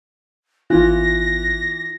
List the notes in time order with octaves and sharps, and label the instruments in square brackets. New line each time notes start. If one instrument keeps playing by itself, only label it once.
[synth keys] G#1 B3 F#6 [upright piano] E3 [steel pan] F4 [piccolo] A#6